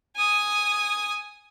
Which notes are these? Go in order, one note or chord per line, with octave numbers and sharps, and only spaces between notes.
G#5 D#6